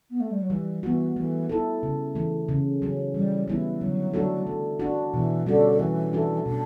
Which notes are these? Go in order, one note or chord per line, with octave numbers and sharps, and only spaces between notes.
B3
A3
G3
F#3
E3 G3
E3 B3 F#4
E3 A3
E4 A4
C#3
E3 A3
C#3
F#3 C#4
E3 G3
E3 G3 B3 E4
D3 F#3
A3 D4 F#4 A4
A3
D4 F#4
B2 E3
D3 G3 C#4 F#4
E3 A3
D4 F#4 A4
B2 D4